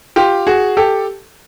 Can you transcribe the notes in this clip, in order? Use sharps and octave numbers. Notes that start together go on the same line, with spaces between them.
F4 G4
F#4 G#4
G4 A4